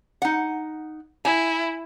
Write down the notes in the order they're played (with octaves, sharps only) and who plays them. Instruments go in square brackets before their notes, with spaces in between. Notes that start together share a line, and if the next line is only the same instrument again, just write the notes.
[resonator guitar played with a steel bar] D#4 F#5
[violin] E4 [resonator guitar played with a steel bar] G#5